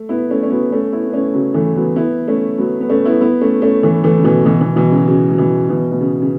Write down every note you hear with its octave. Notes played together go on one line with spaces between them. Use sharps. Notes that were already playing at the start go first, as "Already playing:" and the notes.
Already playing: A3
B3 E4
A3 C#4
C#4
F#3 B3
A3 C#4
B3 E4
B3
A3 C#4
C#3 F#3
E3 A3
F#3 B3
B3 E4
A3 C#4
F#3 B3
B3
A3 C#4
B3 E4
B3 E4
A3 C#4
A3 C#4
E3 A3
E3 A3
C#3
B2 E3
B2 E3
B2 E3
B2 E3
C#3 F#3
C#3 F#3
F#3
B2 E3
B2 E3
B2
C#3
C#3